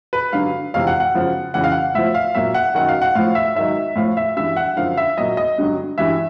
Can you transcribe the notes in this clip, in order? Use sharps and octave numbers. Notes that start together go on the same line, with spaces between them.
B4
G2 D3 F#3 F5
F2 C3 E3 F5
F#5
F#5
F#2 C#3 F3
F2 C#3 E3 F#5
F5
F#5
A2 F3 E5
F5
A#2 F#3 E5
F#5
F#2 D#3 F#3 F#5
F5
F#5
A2 F3 F5
E5
G#2 D#3 F#3 E5
A2 F3 F5
E5
G2 E3 E5
F#5
F#2 D3 F3 F5
E5
A#2 F#3 D#5
D#5
G2 D3 F#3
G2 E3 E5